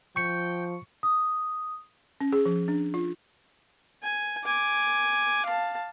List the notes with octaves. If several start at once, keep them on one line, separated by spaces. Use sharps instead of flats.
F3 G5 C#6 G6 C#7
D#6
C#4
G#4
F3
D4
F4
G#5
G#5 D6
F5 A5